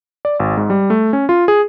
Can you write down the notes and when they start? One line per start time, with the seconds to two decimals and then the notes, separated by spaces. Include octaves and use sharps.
0.25 D5
0.40 G#1
0.57 G#2
0.70 G3
0.90 A3
1.13 C#4
1.29 F4
1.48 G#4